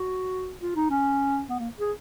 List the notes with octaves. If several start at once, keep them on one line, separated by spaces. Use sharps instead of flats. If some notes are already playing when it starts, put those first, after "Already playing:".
Already playing: F#4
F4
D#4
C#4
B3
A#3
G#4